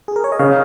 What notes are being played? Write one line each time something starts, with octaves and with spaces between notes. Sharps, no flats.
G#4
A#4
C#5
D#5
C#3 C#5 F5